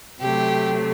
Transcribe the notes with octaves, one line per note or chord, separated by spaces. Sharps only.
C3 F#3 A3 G4